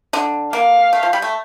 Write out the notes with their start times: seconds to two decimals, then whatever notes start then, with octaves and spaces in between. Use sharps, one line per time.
0.13 D3 D4
0.53 A#3 F5
0.93 A3
1.03 F3
1.13 G3
1.22 A3